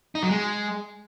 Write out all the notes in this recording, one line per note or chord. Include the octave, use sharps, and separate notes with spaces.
D#4
F#3
G#3